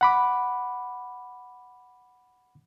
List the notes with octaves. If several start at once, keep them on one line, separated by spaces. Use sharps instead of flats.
F#5 B5 D6